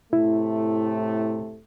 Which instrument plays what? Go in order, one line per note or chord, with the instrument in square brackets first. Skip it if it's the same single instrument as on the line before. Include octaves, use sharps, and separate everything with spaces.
[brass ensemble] A2 C3 A3 [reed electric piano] E4